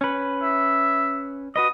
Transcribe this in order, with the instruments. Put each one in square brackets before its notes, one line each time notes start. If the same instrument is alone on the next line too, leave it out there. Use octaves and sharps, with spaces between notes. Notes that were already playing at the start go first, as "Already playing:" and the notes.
[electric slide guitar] C#4 B4
[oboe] E5
[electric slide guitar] F#4 B4 D#5 [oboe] D#6